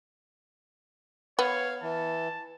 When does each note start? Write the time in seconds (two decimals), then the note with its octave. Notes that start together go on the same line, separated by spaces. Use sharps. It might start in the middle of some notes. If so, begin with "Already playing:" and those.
1.39 B3 C#5 F5
1.82 E3 A5